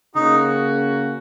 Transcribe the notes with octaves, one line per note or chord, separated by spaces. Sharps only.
C#3 A#3 C#4 D#4 F#4